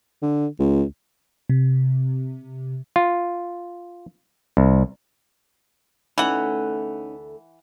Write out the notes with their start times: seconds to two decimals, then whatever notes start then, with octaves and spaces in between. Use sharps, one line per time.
0.22 D3
0.59 C#2
1.50 C3
2.96 F4
4.57 C2
6.18 D2 E3 A3 C#4 D#4 F#5